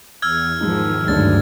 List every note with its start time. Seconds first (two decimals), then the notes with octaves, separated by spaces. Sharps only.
0.22 E2 E6 F6 G#6
0.60 G#2 D#3 F3 G#3 D#4
1.08 D2 G2 F#3 G#3 D4 A6